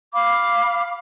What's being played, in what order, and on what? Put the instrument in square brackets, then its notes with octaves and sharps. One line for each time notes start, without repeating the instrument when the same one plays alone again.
[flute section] F5 B5 D6